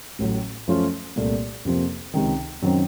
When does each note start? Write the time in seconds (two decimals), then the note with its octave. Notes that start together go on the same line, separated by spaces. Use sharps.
0.19 A1 A2 F#3
0.68 F#2 F3 A3 C#4 F4
1.16 C2 A#2 A3
1.65 F2 C3 F3 A#3
2.14 C#2 C3 D#3
2.62 F#2 D#3 F#3 C4